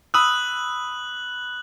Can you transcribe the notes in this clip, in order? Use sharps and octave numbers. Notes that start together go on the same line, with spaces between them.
B5 D#6 E6 F#6 F#7